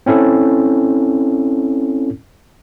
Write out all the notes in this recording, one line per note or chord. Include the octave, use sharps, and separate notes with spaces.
C4 C#4 E4 A4